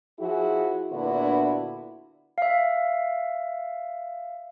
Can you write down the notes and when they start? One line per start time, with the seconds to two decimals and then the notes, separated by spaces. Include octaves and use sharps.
0.20 F3 E4 F#4 G#4
0.91 A#2 D3 B3 D4 E4 F#4
2.38 E5 F5